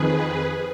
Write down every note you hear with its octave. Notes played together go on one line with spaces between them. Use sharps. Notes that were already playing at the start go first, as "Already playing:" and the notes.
Already playing: F2 D#3 G#4 B4